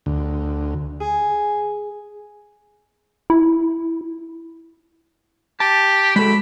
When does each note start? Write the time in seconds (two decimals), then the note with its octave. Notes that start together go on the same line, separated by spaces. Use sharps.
0.06 D2
1.00 G#4
3.30 E4
5.60 G4 A5
6.16 G#3 F#4 A4 B5